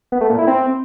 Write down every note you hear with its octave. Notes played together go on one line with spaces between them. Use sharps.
B3
A3
A#2
E4
C4